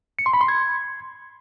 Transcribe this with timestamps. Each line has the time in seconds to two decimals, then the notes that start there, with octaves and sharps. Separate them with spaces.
0.19 C#7
0.26 C6
0.33 B5
0.41 C6
0.48 G#6